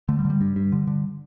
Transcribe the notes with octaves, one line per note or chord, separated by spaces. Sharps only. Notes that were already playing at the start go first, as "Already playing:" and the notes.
D3 A3
G3
D3
G3
G2
G2
D3
D3